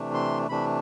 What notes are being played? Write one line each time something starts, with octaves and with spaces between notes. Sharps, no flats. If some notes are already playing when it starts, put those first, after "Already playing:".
Already playing: C3 E3 A3 D4
C6
C3 E3 A3 D4 B5